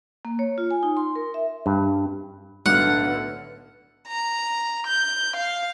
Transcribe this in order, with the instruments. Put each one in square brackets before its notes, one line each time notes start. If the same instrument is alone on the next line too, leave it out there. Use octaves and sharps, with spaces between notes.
[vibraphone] A#3
C#5
F4
G#5
D#4
C6
A#4
E5
[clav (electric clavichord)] G2
[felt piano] B1 D4 F6 [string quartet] A2 D3 B3 [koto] F#5
[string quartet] A#5
G6
F5